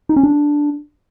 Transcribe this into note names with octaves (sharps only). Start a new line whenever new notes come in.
D#4
C#4
D4